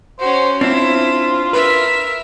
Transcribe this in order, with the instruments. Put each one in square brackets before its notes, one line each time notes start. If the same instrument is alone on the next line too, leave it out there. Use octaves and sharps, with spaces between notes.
[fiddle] C#4 F#4 [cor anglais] C5
[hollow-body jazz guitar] C4 D4 [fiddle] E4 [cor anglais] F4
[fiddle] A#4 E5 [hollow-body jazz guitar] B4